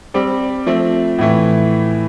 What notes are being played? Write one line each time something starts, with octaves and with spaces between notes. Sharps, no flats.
G3 C4 G4
F3 A3 C4
A2 E3 A3